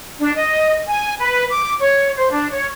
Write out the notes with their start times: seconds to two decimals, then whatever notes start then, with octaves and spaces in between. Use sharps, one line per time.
0.20 D4
0.36 D#5
0.87 G#5
1.19 B4
1.50 D6
1.79 C#5
2.17 C5
2.31 D4
2.51 C#5